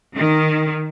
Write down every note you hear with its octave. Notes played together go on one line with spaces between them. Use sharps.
D#3